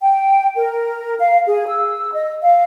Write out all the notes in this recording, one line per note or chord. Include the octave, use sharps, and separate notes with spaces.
G5
A#4
F5
G#4
E6
D#5
F5